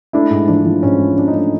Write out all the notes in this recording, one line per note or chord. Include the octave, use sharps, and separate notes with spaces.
A3 D4 E4
G#2
F3 D4
F3
G#2 C#4
F3
F3 D4
D#4
A3 D4